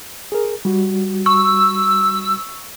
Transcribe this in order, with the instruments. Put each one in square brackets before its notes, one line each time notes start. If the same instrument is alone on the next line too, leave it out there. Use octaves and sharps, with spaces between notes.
[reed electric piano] G#4 A#4
G3 F#4
[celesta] C#6 [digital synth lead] E6